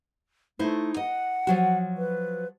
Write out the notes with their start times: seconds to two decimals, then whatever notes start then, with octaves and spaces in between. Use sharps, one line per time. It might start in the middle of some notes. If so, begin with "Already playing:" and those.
0.59 A3 D#4 E4 C5
0.97 D#5 F#5
1.47 F3 F#3 F#4
1.98 B4